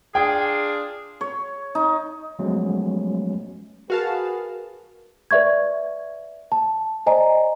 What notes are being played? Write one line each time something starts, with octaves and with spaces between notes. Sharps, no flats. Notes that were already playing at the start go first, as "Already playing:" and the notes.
D4 F4 G#4 G5
C#5
D#4
F3 F#3 G#3 A3 B3 C#4
F#4 G#4 A#4 B4 F5 A5
B4 D5 E5 C#6 G#6
A5
C5 D5 D#5 G#5 A#5